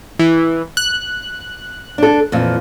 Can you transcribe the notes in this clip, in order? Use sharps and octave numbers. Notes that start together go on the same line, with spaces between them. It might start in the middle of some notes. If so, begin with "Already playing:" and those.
E3
F#6
D4 A4
F2 A#2 E3